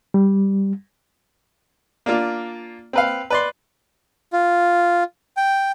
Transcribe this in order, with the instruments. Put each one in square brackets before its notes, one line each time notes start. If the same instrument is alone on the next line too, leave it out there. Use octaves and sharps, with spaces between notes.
[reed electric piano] G3
[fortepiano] A#3 D4 F4
C4 B4 F5
B4 D5 C6
[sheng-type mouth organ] F4
G5